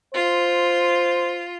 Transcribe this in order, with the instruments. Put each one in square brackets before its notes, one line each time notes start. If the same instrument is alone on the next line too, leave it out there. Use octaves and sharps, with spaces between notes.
[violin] F4 [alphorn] C5